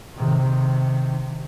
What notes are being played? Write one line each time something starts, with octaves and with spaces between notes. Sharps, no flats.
C3 D#3